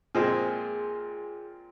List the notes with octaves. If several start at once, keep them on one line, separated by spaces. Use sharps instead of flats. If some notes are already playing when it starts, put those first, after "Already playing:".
A#2 F3 G#3 C4 G#4